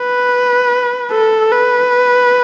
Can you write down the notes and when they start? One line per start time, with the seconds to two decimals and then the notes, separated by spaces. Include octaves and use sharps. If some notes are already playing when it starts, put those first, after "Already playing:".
Already playing: B4
1.11 A4
1.53 B4